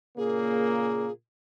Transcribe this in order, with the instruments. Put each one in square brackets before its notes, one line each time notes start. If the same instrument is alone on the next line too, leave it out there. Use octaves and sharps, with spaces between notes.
[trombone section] A#2 C#3 A#3 [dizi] G#4